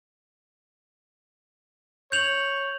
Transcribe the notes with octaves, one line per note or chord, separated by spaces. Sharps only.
C#5 G6 F7 F#7